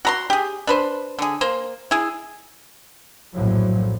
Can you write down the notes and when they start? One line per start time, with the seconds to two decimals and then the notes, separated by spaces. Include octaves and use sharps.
0.05 F#4 A#5 C6
0.30 G4 G#4
0.67 D4 B4 C5
1.19 D3 G#4
1.41 A#3 C5
1.91 E4 G#4
3.34 A#1 F#2 A2 F3 F#3